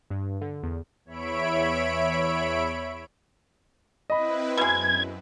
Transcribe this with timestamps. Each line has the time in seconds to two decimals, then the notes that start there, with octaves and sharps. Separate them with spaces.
0.10 G2
0.41 D3
0.63 E2
1.05 E2 C#5 E5 B5 D7
4.10 C4 E4 B4 D#5 B5
4.57 F#2 B2 G#3 G#6